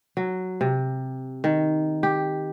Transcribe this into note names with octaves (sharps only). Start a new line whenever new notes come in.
F#3
C3
D#3
G4